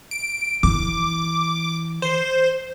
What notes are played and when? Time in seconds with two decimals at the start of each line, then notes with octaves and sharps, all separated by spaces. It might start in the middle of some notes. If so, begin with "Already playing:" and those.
0.11 D7
0.63 E3 D6
2.02 C5